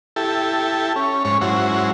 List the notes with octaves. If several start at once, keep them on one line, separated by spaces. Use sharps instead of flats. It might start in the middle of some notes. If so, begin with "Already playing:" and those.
E4 G4 A4
C#4
G#2 C#4 C#5
G#2 F#3 C#4 E4 F#4 C5